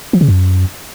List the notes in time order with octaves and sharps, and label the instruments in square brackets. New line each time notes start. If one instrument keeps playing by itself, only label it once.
[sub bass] F3
C#3
F#2